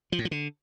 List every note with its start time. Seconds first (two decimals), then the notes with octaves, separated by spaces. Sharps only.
0.12 F3
0.19 A2
0.25 F3
0.31 D3